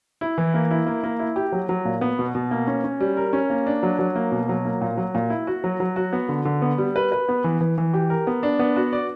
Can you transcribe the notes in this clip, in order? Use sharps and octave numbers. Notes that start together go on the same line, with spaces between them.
E4
E3
A#3
E4
A#3
A#3
E4
G4
F#3
F#3
A#2
B3
B2
B2
A#3
C#4
C#4
G3
A#4
C#4
A#3
D4
F#3
F#3
A#3
B2
F#3
A#3
A#2
F#3
A#2
E4
F#4
F#3
F#3
F#4
B3
D3
D3
B3
G3
B4
B4
B3
E3
E3
E3
G4
A#4
B3
D4
B3
F#4
D5